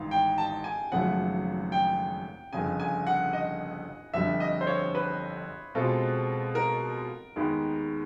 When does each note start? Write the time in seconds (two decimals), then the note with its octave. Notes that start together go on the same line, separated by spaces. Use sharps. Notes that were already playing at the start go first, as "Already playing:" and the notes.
Already playing: A1 G#2 D#3 F5
0.11 G5
0.38 A5
0.64 G#5
0.92 G#1 F#2 C#3 F3 A3 F#5
1.72 G5
2.53 G1 F2 C#3 G#5
2.80 G#5
3.07 F#5
3.33 D#5
4.14 G1 F2 D3 G3 E5
4.40 D#5
4.61 C5
4.67 C#5
4.95 B4
5.75 B2 G#3 C4 F4 A4
6.55 A#4
7.36 D#2 D#3 G#3 B3